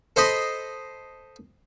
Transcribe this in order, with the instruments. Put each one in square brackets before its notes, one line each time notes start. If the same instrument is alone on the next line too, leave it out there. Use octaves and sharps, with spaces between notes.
[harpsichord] A4 C5 D#5 B5 C6